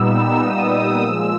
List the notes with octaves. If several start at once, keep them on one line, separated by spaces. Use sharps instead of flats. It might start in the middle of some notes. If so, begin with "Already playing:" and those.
Already playing: A#2 G3 B3 D#4 E6
D#6
A#2 F3 G#3 E6